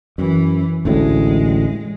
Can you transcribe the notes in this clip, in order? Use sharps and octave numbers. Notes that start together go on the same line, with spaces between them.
F#2 E3
A1 D2 A2 G#3